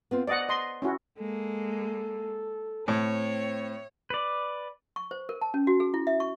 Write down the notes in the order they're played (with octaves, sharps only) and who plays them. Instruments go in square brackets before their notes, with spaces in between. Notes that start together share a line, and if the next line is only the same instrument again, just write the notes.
[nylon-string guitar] B3 C4 F4
[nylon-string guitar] C5 [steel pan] D5 D#5 F#5
[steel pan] D#5 C6
C#4 E4 F#4
[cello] G#3 A#3 [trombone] A4
[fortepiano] A2 [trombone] C4 [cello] C#5
[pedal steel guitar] B4 D5
[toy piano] C#6
C5
A#4
A5
C#4
F#4
G#4
E4
E5
C#6